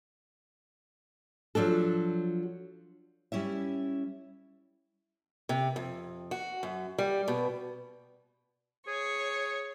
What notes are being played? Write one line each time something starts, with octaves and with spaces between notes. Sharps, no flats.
F3 F#3 D4 A4
G3 C#4 E4 E5
C3
F2
F#4
F#2
G3
B2
G#4 C#5